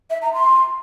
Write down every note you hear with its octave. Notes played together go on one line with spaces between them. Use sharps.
E5
A#5
C6